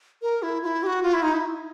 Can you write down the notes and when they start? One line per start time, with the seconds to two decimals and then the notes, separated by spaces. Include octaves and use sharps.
0.22 A#4
0.42 E4
0.63 F4
0.66 E4
0.83 G4
0.87 F#4
1.03 F4
1.13 E4
1.23 D#4
1.34 E4